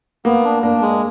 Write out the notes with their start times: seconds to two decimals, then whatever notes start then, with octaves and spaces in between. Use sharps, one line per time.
0.25 A#3 B3
0.45 D4
0.63 A#3 D4
0.82 G#3